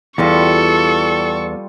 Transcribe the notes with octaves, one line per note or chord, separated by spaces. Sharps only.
E2 G3 F4 A4 C#6 D6